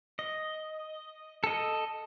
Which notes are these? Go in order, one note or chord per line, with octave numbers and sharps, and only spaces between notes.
D#5
A4 D#5